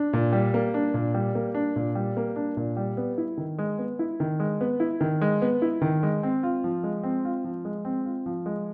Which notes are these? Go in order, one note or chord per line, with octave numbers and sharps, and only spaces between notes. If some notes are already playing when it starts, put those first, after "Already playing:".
Already playing: D4
A#2
G3
A#3
D4
A#2
G3
A#3
D4
A#2
G3
A#3
D4
A#2
G3
B3
E4
D#3
G#3
B3
E4
D#3
G#3
B3
E4
D#3
G#3
B3
E4
D#3
G#3
C4
F4
F3
G#3
C4
F4
F3
G#3
C4
F4
F3
G#3